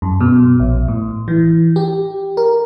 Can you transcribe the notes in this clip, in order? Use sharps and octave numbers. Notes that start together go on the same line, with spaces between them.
F#2
B2
A#1
A2
E3
G4
A#4